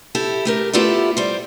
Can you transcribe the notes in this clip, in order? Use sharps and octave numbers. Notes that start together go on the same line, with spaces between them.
E4 G4 A4
A3 G4 A#4
A3 B3 E4 F4 G4 A4
G3 C5